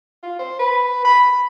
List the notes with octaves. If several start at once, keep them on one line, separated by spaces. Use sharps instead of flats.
F4
C5
B4
B5